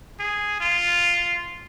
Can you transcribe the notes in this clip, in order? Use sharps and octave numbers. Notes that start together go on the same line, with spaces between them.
G#4
F4